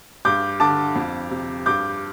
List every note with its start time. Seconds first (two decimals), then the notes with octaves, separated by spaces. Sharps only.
0.25 G2 D6 G6
0.60 D3 A5 D6
0.96 F2
1.31 C3
1.66 G2 D6 G6